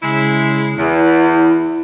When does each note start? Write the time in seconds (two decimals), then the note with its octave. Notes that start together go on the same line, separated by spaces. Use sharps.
0.03 C#3 G#3 E4
0.78 E2 E4